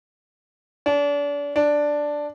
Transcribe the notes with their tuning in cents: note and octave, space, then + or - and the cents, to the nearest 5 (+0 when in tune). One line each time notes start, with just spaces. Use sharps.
D4 -35
D4 +0